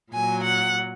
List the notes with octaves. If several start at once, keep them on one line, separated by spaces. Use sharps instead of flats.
A#2 F#3 G#5
F#5